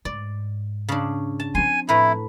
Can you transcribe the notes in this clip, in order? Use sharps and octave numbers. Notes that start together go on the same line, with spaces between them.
G#2 D5
C#3 D4
A5
F3 C4 G#5 C6
A2 E4 B4 A#5